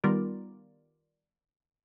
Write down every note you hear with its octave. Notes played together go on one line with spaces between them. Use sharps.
D#3 G3 B3 F4 A#4 D5